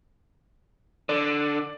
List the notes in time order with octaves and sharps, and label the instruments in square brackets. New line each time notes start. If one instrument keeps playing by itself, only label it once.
[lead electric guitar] D3 [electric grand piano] D5